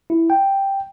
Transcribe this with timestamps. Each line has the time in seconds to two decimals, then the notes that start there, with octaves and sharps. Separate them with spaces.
0.10 E4
0.30 G5